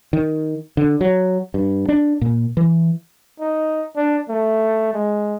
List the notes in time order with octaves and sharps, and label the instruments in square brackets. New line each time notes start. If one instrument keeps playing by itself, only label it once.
[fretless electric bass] D#3
D3
F#3
G2
D4
A#2
E3
[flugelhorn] D#4
D4
A3
G#3